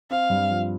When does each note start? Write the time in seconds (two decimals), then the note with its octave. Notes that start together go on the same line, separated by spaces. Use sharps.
0.10 C4 F5
0.30 G2
0.50 F3